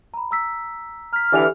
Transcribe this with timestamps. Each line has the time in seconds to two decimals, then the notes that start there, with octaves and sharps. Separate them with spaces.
0.14 A#5 B5
0.31 A#5 E6 B6
1.13 A#5 F6 B6
1.32 D3 E3 G4 G#5 F7